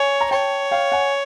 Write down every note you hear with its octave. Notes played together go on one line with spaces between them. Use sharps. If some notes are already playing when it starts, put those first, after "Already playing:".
Already playing: C#5 G#5
A#5
C#5 G5 A5
F5 G5
F#5 G#5